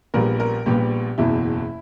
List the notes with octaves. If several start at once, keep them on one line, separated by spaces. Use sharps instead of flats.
A#1 A#2 G3 B3 A#4
A#4
A#1 A#2 G3 B3 G4
F#1 E2 B2 E4